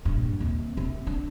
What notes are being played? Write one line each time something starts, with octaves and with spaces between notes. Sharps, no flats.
G2 A#2
D#2 C3
C3 C4
D4